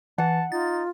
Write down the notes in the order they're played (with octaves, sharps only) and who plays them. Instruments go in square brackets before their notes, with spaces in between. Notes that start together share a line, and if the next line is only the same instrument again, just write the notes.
[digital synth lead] E3 [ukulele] F#5 [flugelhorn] A5
[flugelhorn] D#4 [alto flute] F4 [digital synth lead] A6